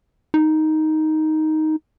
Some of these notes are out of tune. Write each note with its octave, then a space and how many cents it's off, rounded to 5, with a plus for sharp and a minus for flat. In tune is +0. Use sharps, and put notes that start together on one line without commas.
D#4 +5